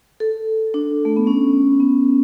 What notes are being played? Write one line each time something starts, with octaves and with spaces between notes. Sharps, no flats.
A4
D4
A3
B3
C#4
B3